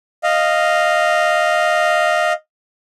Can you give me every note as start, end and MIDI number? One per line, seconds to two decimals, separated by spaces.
0.23 2.33 75
0.23 2.33 77